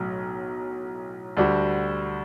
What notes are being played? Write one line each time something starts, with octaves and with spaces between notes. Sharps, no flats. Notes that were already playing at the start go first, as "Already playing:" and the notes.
Already playing: B1 A2 F#3
D2 D3 G3 D4 F#4